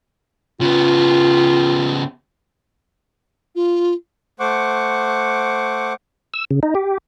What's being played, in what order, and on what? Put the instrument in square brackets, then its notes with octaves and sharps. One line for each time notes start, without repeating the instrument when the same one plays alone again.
[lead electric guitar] C#3 B3 [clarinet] F4
[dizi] F4
[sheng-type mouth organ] A3 C5 F#5 C#6 D6
[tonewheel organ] E6
C#3
D#4
G4